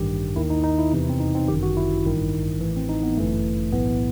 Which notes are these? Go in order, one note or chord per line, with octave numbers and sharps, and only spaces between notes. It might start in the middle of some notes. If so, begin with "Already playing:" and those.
Already playing: A1 G2 D#3 G4
D#2 D#3 E4
D#4
D#4
E4
E2 C3 E3
C4
D#4
C4
G1 F#2 D#3 G4
F#4
E4
A1 G2 D#3
A1 A2 E3
C4
D#4
B3
G1 F#2 E3 A3
B1 A2 E3 B3